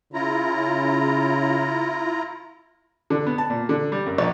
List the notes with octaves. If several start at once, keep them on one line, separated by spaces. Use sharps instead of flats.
C#3 E4 F4 A#5
D3
B3
A5
A#2
D3
G3
F#2
A#1